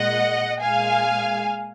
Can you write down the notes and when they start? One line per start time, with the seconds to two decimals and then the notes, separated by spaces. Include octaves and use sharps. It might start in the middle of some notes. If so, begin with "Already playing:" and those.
Already playing: A#2 G#3 D#5 F#5
0.61 A#2 G#3 F5 G#5